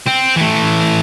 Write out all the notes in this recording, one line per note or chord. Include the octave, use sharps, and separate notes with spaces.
C4
E3 A3